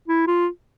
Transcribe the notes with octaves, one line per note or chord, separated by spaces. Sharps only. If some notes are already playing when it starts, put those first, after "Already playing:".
E4
F4